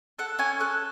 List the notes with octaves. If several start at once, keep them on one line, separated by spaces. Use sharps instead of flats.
A4 F#5
C#4 G#5
A4 F#6